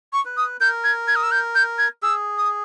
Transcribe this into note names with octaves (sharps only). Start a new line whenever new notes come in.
C#6
B4
D#6
A#4 G6
G#6
G#6
D#6
E6
G6
G6
G#6
G#4 E6
D#6